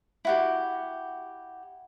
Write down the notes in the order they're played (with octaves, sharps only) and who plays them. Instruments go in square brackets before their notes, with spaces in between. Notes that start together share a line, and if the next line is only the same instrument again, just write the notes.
[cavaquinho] E4 F#4 G4